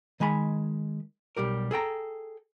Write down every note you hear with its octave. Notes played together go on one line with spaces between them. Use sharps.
D#3 G#3 G#5 B5
B1 G3 G4 A#4
G#4 A4 G5 A#5